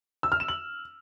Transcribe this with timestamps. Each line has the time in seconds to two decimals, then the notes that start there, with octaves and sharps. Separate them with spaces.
0.23 E6
0.32 F6
0.40 E7
0.48 F#7